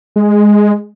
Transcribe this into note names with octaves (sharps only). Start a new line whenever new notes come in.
G#3